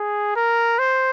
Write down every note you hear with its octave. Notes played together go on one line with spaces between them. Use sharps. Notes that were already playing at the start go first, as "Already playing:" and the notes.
Already playing: G#4
A#4
C5